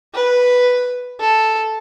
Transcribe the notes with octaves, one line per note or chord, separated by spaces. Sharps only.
B4
A4